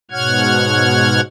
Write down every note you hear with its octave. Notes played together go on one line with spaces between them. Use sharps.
G#2 B2 C#5 F#5 F6 G#6